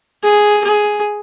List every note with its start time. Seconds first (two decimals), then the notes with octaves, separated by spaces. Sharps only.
0.23 G#4
0.64 G#4